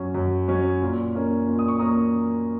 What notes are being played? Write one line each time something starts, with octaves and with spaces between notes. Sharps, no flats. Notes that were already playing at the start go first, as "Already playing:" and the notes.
Already playing: F#2 F#3 C#4
F#2
F#3 C#4
A#2
A#3 C#4
A#2
D#6
C#6
A#3 C#4 A#5 D#6